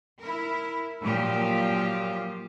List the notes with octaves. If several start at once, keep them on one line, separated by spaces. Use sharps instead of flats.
E4 A#4
A#2 F3 F#3 F4 G4